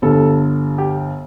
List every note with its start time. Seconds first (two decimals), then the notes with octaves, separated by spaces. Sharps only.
0.02 G1 G2 D3 A4
0.78 G4